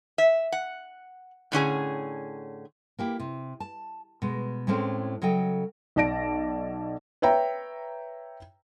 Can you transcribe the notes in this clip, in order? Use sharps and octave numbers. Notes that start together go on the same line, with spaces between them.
E5
F#5
A2 D3 C#4 G#4
A#3 E4 G4
C3
A5
B2 G#3
A2 G#3 A3 C4 C#4 C5
C#3 F#3 A4 D#5 G5
B1 D5 A5 A#6 D7
B4 C#5 E5 G5 A#5